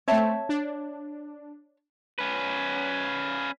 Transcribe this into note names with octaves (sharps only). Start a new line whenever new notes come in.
A3 C4 C#5 E5 A5
D4
C#4 B4